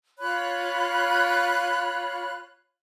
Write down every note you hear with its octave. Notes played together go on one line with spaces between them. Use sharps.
F4 C#5 B5 F#6